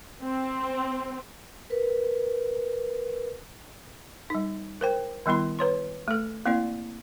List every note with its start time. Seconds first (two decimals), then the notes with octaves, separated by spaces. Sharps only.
0.22 C4
1.70 A#4 B4
4.30 G3 D#4
4.81 A#4 C5 G5
5.26 D#3 G3 B3 E4 B5
5.59 B4 C#5 C6
6.08 A3 A4
6.46 A#3 C4 E4 D5